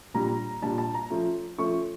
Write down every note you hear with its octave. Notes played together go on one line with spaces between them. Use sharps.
A#2 G3 D4 A#5
A#2 G3 D4 A5
A5
A#5
F3 A3 C#4
F3 A3 C#4 C#6